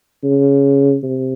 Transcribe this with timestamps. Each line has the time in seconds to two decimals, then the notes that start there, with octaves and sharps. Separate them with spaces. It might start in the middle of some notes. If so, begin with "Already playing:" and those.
0.24 C#3
1.03 C3